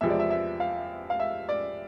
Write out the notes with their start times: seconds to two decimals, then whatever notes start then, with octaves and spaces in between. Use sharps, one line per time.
0.01 E2 C3 F3 G#3 E5
0.10 D5
0.20 E5
0.30 E5
0.60 F5
1.10 F5
1.20 E5
1.49 D5